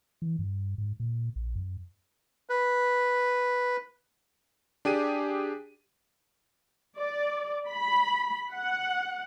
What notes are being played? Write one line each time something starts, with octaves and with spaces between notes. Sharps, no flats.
E3
G2
G#2
A#2
A#1
F#2
B4
D4 G4 G#4 D#7
D5
B5
F#5